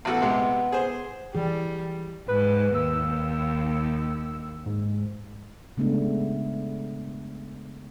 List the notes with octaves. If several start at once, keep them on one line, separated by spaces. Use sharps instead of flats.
A1 B3 F#4 A4
C3 G#3 G4
G#4 C5
E3 G3 G#4
G#2 B4
D#2 E6
G#2
C#3 G#3 A3 B3 D4